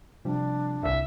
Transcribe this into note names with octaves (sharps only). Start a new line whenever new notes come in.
C3 F3 G3 D4
G1 C2 E5